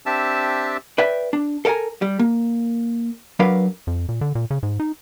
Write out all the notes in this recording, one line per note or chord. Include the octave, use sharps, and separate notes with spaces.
C4 D4 G4 E5 A5 E6
B4 D5 E5 G5
D4
A4 A#4 E5 G#5 A#5
G3
A#3
F#3 D4 A#4 B4 F5
F2
A#2
D3
A#2
C#3
G#2
D#4